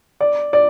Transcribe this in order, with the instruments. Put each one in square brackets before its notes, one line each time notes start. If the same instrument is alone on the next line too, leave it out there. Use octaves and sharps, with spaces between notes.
[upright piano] D5
D5